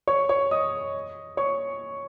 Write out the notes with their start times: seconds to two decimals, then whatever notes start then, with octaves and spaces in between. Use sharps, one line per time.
0.07 C#5 C#6
0.29 C#5 C#6
0.51 D#5 D#6
1.37 C#5 C#6